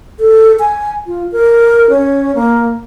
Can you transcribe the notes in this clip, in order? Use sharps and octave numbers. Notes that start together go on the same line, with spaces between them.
A4
G#5
F4
A#4
C#4
A#3